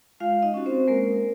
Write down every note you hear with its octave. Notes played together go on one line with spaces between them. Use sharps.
G#3 F4 F5
D#4 D#5
C#4 F#4
C4 C5
G#3 A#3 A#4